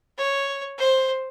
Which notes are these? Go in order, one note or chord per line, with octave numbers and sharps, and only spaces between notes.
C#5
C5